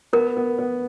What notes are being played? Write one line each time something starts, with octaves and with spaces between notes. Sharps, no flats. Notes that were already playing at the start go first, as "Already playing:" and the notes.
B3 A#4
B3
B3